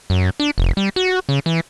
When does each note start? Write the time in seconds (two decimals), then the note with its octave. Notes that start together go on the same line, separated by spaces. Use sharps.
0.10 F#2
0.40 D4
0.58 F1
0.77 G3
0.96 F#4
1.29 C#3
1.46 E3